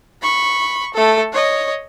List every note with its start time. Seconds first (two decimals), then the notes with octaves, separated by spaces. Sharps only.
0.22 B5 C#6
0.94 A3 A4
1.33 C#5 D#5